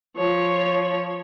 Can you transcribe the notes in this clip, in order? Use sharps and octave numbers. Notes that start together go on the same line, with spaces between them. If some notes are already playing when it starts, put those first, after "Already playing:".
F3 C#5